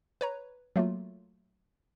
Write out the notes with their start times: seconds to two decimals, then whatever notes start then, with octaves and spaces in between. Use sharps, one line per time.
0.21 B4 C#5 A#5
0.76 F#3 A3 A#3 F4